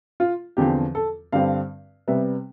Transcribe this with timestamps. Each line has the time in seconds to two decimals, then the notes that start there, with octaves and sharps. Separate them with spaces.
0.20 F4
0.57 E2 D3 F3 C4 G4
0.95 A4
1.32 G2 D3 G3 C4 F5
2.08 C3 G3 B3 E5